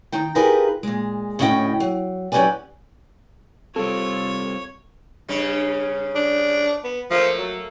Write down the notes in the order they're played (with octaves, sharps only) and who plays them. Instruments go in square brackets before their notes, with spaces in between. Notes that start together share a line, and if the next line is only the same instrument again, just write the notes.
[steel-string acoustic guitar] D#3 D#4 G5
D#4 F4 G4 G#4 A#4 B4
A#2 G#3
D2 A2 C#4 D#5 E5 G5
F#3
F#3 C#4 G4 B4 D5 G#5
[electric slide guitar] G3 C4 [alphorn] F4 [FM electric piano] A4 [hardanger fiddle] C#5
[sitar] G2 C#3 C#4
[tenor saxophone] D4
B3
[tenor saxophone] F3 [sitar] A3 A#3
[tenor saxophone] F#3